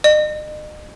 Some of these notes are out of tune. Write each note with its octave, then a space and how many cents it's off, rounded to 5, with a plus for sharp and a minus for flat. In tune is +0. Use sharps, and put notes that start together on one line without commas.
D#5 -40